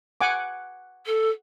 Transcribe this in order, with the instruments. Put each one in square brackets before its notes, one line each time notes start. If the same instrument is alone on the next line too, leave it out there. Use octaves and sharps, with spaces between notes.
[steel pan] F#5 G#5 D6
[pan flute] A4